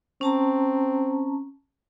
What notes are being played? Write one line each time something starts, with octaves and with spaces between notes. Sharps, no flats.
C4 C#4 A5 A#5